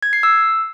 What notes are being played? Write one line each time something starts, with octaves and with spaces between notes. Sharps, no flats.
G#6
C7
E6